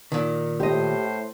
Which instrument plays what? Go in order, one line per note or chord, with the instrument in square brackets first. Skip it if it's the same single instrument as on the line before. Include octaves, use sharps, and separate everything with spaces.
[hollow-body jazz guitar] A#2 D#3
[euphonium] A2 [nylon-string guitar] G4 D#5 [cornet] C5